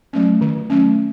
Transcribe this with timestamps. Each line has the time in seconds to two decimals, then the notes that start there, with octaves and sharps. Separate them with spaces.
0.13 F#3 A3 C#4
0.41 D#3
0.70 F#3 A3 C#4